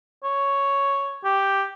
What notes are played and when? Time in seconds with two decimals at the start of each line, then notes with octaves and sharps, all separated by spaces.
0.24 C#5
1.24 G4